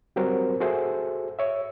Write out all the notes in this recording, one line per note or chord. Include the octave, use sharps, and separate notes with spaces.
F#3 G3 C4 F#4 A#4 C5
F#4 G#4 A4 C5 E5
C#5 E5